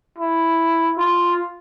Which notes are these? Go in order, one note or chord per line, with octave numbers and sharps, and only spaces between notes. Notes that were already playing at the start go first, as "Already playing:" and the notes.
E4
F4